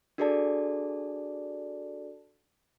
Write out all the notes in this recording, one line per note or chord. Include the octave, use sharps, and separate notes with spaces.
D4 F#4 G#4 A4 D5 A5